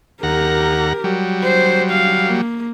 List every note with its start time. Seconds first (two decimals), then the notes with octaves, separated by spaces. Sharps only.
0.23 D#2 G4 A#4 F#5 A#5
1.04 F#3 G3
1.44 C5
1.91 F5
2.26 A#3